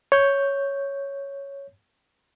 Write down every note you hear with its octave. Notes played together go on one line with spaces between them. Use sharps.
C#5 G6